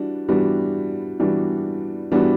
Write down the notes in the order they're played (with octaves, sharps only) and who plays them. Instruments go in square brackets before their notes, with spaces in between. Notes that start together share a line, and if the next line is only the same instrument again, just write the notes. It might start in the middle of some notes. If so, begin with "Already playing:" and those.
Already playing: [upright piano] E3 G3 D4 F#4
E3 G3 B3 D4 F#4
E3 G3 B3 D4 F#4
E3 G3 B3 D4 F#4